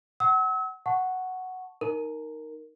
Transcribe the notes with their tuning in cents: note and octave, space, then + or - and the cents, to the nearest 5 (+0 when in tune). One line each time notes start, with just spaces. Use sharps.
F#5 +25 E6 -40
F#5 +0 A5 +0 C#6 +0
D#4 +0 A#4 -5